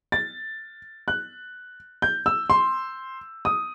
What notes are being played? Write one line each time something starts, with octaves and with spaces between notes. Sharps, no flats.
A6
F#6
G6
E6
C6
D#6